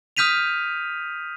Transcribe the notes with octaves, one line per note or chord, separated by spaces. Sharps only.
D#6 F6 G6 B6 D#7 F7